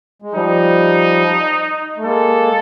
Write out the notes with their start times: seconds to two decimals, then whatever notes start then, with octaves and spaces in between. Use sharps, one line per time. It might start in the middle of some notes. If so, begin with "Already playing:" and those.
0.22 G#3
0.34 F3 G3 D#4
1.97 A3
2.04 G#3 A#3 A4